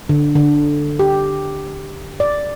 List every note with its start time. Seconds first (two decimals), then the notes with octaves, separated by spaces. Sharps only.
0.09 D3
0.35 D3
0.99 G4
2.20 D5